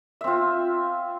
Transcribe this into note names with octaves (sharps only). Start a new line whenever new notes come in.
C4 F4 E5